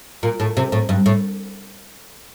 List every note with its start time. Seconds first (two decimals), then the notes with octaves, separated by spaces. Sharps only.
0.23 A#2
0.40 A2
0.57 C3
0.72 A2
0.89 G2
1.06 A2